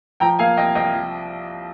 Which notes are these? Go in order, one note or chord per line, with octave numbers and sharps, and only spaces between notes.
F3 G5 A#5
A#3 F5 G#5
C2 D#5 G5
C2 D#5 G5
F3